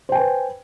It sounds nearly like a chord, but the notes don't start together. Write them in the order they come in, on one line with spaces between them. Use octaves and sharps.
C5 G5 G#5 B4